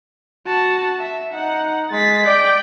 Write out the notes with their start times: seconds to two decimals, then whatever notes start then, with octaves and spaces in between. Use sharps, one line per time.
0.46 F#4 A5
0.99 E5
1.33 D#4 F#5
1.91 G#3 A6 B6
2.26 D5 G5